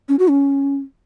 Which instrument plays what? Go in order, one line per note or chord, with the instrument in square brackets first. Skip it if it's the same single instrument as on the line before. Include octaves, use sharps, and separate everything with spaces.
[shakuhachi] C#4
F#4
C#4